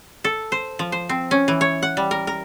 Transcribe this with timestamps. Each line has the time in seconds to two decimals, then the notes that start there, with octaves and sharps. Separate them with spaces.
0.24 A4
0.52 C5
0.79 F3
0.92 C5
1.09 C4
1.31 C#4
1.48 E3
1.61 C#5
1.83 F#5
1.97 G3
2.11 A#4
2.27 A#4